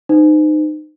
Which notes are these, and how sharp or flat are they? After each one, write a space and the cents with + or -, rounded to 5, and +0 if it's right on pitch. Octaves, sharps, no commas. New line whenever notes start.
D#4 -25 C5 -35